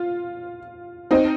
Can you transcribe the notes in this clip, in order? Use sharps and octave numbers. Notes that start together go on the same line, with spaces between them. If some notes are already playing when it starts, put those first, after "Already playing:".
Already playing: F4
C4 D#4